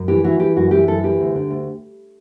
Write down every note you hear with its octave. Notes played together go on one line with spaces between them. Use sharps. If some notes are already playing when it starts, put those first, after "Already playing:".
Already playing: F#2
E3 G4
E3 F#4
E3 G4
F#2 F#4
E3 G4
F#2 A4
E3 G4
D2
D3
D2